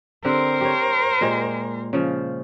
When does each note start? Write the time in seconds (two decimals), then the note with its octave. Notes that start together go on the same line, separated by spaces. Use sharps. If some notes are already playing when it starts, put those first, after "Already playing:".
0.24 D3 C4 G4 A#4 C5
0.61 G4 C#5
1.21 A#2 G#3 G4
1.93 C#3 F3